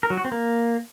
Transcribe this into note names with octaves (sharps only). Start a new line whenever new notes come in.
A#4
F#3
F#4
C4
A#3